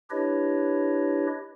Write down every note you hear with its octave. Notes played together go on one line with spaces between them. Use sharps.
D4 E4 G4 B4 C#5 D#5